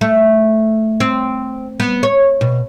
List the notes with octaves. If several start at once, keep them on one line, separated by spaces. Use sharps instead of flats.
A3
C4
B3
C#5
B2